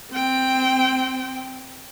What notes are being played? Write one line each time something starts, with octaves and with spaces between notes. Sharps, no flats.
C4 G5